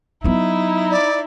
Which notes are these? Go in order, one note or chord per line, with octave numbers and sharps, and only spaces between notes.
F#3 B3 D#4 E4
D5